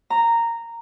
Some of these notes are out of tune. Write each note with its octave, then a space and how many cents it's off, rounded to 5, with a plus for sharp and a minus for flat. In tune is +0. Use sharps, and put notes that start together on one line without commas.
A#5 -10